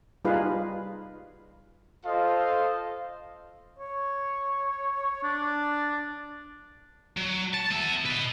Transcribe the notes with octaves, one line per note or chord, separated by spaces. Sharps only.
G3 D#4 F4 G#4 B4 F5
F4 A4 C5 D#5 F5
C#5
D4
F#3
A5
B3 E5
B4 D#5